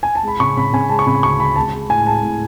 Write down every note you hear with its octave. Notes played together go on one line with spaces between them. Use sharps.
G#5
A5
G#3 B5
C#3 C#6
C#3 B5
C#3 G#5
G#3 A5
C#6
C#3 B5
D2 C#6
G#3 B5
G#3 A5
G#3
A2 G#5
G#3 A5
A2